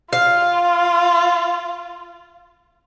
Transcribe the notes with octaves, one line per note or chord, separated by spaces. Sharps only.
F4 F5